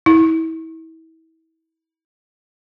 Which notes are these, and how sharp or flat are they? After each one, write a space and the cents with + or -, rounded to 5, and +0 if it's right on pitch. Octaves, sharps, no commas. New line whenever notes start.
E4 -30